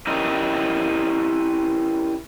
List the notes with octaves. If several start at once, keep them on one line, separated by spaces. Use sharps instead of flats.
C#4 E4 G4 A#4 D#5